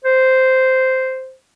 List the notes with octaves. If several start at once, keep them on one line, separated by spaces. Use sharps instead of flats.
C5